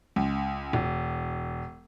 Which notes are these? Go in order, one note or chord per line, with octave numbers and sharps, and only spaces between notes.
C#2
E1